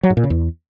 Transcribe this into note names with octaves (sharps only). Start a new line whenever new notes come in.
F#3
G#2
A#2
C#3
E2